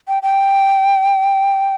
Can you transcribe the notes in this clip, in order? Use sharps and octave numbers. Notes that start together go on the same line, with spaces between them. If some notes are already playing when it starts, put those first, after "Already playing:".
G5
G5